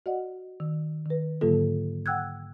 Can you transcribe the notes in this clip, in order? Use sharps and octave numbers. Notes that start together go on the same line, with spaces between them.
F#4 D5 D#5 F#5
D#3
D#3 B4
G#2 D3 F#3 A#3 F4 A4
F#5 G5 E6 F#6 G#6